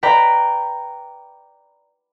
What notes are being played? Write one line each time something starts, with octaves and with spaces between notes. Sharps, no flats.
B4 D5 G5 A#5 B5